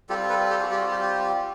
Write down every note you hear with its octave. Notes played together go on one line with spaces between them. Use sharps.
G3 C4 F4 G4 A4
A4 B4
G4 A4
F#4 G#4
G4
F#4
G4
G4